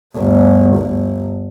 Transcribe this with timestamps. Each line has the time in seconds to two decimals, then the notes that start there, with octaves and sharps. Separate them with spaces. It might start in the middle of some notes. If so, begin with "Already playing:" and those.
0.15 G1 D2
0.76 G1